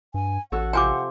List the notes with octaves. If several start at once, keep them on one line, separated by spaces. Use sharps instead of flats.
G2 G#5
A1 F#4 A4 C#5 F#5
C3 F3 C5 G5 G#5 D6